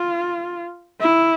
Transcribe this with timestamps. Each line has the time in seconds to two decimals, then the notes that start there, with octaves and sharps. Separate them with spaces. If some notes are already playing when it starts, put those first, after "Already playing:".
Already playing: F4
1.00 E4